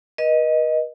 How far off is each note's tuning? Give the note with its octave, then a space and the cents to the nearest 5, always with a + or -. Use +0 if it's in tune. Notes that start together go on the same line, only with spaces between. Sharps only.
B4 -40 D#5 +0